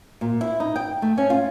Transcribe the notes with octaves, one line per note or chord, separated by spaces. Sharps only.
A#2
E4
D#4
G5
A3
C#4
F4